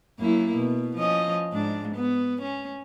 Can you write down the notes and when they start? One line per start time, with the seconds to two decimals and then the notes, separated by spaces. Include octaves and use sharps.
0.19 F#2 A#3 E4
0.55 B2
0.96 F3 C#4 D#5
1.52 G#2 D4
1.95 B3
2.42 C#4